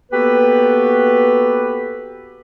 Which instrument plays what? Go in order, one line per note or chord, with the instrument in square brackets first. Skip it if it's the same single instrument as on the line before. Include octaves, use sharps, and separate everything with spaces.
[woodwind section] A#3 B3 F#4 G4 A4 B4